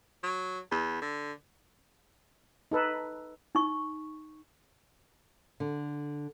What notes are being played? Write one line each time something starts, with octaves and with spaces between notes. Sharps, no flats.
F#3
E2
D3
D#4 A4 B4
D#4 C#6
D3